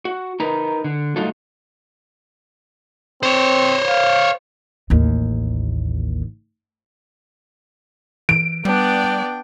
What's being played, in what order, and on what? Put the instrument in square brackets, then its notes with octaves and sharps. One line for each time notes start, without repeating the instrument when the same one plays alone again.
[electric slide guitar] F#4
D#4 A#4 B4 A#5
D3
G3 A3 D#4 F4 F#4 A4
[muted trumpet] C4 [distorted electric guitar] C5 C#5
[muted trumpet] F5
[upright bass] A1 D#2
[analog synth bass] E3 [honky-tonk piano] D7
[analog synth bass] G3 [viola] B3 D5 [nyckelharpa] D4 G5